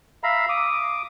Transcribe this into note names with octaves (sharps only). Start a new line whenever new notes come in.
E5 F5 A#5 B5
D6 D#6